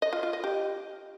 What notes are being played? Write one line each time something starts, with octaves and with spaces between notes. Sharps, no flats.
D#5
F4
F4
D#5
G4